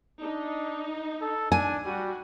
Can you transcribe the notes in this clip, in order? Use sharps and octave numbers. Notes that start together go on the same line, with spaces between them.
D4 D#4
A4
D4 G#5
G3 F#4